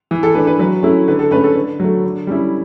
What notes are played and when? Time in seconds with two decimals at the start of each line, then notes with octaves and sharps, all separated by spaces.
0.11 E3
0.23 A4
0.35 A3 D4 B4
0.47 B4
0.59 F#3 B4
0.83 A3 C#4 E4
1.08 D3 B4
1.19 A4
1.31 A3 C#4 B4
1.44 A4
1.55 D3 B4
1.80 F#3 A3
2.04 D3
2.27 G3 C#4 E4